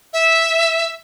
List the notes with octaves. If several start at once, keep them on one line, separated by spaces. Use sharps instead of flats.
E5